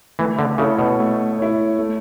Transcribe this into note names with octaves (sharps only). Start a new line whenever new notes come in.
E3 A3
D3
C#3 E4 A4 C#5
B2
A3
E4 A4 C#5
A3